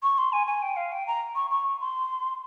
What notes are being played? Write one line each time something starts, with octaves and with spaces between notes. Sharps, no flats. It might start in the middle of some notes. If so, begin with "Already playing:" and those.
C#6
C6
G#5
G#5
G5
F5
G5
A#5
C#6
C#6
C6